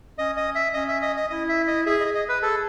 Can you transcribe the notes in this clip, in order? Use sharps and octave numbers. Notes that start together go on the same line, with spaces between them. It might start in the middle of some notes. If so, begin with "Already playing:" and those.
C#4 D#5
D#5
E5
C#4 D#5
E5
D#5
D#5
E4 D#5
E5
D#5
G#4 E5
D#5
G#4
D#5
B4
G#4 A4